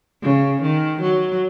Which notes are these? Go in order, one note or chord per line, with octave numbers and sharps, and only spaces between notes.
C#3
D#3
F#3